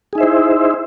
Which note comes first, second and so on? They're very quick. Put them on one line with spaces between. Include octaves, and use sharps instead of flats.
G#4 D#4 E5 C5 E4